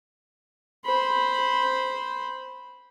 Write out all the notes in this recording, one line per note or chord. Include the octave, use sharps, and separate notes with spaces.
C5 B5